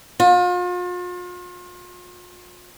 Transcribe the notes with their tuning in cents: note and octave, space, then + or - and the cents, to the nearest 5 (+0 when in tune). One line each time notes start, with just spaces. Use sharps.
F4 +40